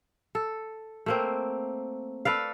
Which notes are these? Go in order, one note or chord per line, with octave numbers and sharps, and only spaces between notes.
A4
A3 A#3 C4
A4 B4 D5 F5